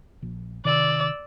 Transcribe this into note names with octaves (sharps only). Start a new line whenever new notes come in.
A#1
C3 D#3 D5 E6